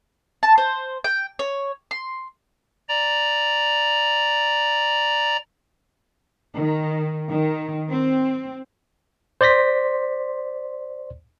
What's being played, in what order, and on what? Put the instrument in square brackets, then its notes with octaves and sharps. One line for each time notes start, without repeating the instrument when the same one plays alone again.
[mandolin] A5
C5
G5
C#5
C6
[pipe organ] D5 A#5
[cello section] D#3
D#3
C4
[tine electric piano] C5 D5 C6 A#6 B6